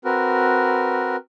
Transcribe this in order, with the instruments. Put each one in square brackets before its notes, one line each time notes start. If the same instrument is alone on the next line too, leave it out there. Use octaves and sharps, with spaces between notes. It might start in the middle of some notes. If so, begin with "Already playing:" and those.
[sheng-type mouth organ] C4 F#4 A#4 B4